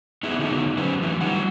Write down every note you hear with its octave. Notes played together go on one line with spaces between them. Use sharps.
B3 D#4 E4 G#4
D3 F#3 G3 A3 B3 D#4
F#3 C#4 B4 C5
E3 A3 D#4
G3 F#5